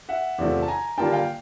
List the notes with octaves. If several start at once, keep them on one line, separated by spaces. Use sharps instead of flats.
E5 F#5
E2 C3 F3 A3
A5
G#5 A#5
D3 G3 A#3 D4 F4 G5 A5
F5 G5